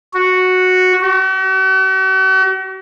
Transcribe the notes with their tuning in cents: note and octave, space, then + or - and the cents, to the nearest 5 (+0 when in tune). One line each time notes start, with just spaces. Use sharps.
F#4 -5
F#4 +45